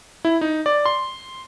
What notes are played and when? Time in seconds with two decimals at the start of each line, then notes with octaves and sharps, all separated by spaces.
0.25 E4
0.41 D#4
0.66 D5
0.86 C6